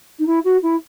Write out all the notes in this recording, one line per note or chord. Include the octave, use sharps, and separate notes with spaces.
D#4
E4
F#4
E4